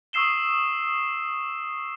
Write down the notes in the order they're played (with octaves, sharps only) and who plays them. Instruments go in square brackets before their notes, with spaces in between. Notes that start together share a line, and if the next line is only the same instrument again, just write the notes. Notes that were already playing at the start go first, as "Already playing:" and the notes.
[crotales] C#6 D#6 E6 C7 E7 G7